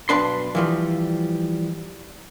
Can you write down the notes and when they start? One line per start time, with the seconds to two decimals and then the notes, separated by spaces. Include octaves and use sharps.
0.09 B1 G2 D4 B4 C6
0.55 E3 F3 G3